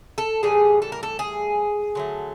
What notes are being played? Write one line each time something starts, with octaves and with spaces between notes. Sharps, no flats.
A4
A2 E3 G3 G#4
A4
A#4
A4
G#4
D3 F#3 A3